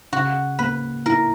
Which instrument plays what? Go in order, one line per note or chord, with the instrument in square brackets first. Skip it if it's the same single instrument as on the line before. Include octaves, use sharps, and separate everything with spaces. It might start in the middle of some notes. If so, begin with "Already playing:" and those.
[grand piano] C#3 [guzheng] F#4
[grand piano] A#3 [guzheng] B4
[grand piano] E4 [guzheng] A#4